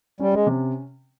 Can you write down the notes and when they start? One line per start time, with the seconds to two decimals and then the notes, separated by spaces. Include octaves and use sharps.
0.20 G3 C#4
0.34 G#3
0.47 C3